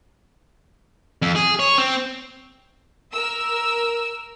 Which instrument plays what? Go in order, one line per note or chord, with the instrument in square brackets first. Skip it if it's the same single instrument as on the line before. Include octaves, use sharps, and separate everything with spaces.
[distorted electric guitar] F2
G#4
C#5
C4
[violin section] A#4 E6